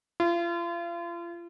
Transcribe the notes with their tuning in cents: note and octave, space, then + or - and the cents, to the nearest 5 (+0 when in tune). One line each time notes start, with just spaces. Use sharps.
F4 -35